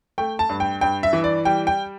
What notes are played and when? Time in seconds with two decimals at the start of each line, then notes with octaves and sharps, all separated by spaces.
0.18 A3 G5
0.39 A5
0.49 G2
0.60 G5
0.81 G2 G5
1.03 E5
1.13 E3
1.24 D5
1.45 G3 G5
1.67 G5